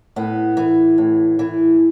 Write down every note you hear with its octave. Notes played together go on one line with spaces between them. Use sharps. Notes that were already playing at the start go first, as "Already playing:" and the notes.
A2 B3
E3
A2
E3